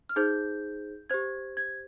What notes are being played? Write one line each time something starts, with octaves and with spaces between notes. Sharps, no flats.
F6
D#4 G#4 C5 G6
G4 C5 G#6
G#6